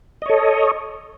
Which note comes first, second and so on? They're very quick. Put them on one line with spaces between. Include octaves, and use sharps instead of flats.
D#5 C#5 A4